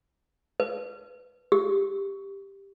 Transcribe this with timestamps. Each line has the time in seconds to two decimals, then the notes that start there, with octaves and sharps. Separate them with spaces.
0.60 B4
1.52 G4